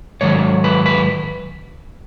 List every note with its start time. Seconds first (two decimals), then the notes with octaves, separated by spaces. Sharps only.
0.21 G#2 D#3 F#3 C#5
0.64 B4
0.86 B4